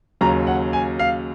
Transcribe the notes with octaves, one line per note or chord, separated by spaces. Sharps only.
D#2 C#3 F#3 A#5
F#5
G#5
F5